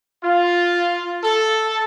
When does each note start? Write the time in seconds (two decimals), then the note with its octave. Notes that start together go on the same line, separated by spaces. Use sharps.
0.23 F4
1.23 A4